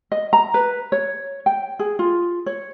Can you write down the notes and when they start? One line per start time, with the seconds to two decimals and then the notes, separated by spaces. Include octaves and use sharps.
0.12 D#5
0.33 A#5
0.54 B4
0.92 C#5
1.46 G5
1.79 G#4
1.99 F4
2.46 C#5